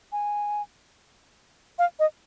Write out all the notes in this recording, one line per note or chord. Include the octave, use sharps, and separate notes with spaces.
G#5
F5
D#5